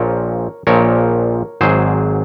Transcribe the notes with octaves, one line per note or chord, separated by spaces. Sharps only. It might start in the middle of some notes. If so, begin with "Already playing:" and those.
Already playing: A#1 A#2 F3 A#4 C#5
A#1 A#2 F3 A#4 C#5
G#1 G#2 F#3 G#4 C5